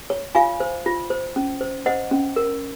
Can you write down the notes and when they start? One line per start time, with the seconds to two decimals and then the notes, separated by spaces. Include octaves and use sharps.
0.10 C#5
0.35 F4 F5 G#5
0.60 C5
0.86 F4
1.10 C5
1.36 C#4
1.61 C5
1.86 C5 D#5 F#5
2.11 C#4
2.36 A#4